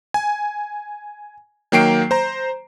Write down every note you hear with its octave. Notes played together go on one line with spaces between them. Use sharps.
G#5
D#3 F#3 A#3 G5 C7 D7
C5 A#5